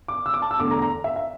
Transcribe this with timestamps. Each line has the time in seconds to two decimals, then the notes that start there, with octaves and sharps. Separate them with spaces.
0.08 D6
0.26 E6
0.34 D6
0.42 A5
0.51 E6
0.59 E2 D3 A3 D6
0.70 A#5
0.82 A#5
1.04 E5
1.16 E5